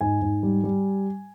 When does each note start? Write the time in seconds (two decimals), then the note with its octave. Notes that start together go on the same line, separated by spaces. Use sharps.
0.01 G#2 G#5
0.22 G#2
0.43 G3
0.64 G3